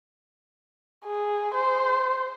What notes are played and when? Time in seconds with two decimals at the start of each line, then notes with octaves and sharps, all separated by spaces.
1.05 G#4
1.54 C5